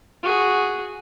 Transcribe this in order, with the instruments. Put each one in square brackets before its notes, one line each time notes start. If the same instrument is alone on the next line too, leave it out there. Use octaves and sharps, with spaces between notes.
[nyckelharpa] F#4 G#4